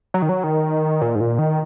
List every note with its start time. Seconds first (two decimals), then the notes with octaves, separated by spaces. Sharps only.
0.14 F#3
0.22 D#3
0.29 F#3
0.44 D#3
1.01 A#2
1.15 G#2
1.21 A#2
1.38 D#3